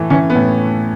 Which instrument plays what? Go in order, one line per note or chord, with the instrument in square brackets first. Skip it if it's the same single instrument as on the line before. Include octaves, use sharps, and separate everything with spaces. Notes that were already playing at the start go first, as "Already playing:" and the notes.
Already playing: [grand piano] A2 E3 A3
[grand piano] E3 [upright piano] C#4
[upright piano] B3
[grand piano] A2